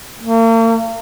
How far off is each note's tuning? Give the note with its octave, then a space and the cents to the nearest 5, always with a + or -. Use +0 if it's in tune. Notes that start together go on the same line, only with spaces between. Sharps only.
A#3 -40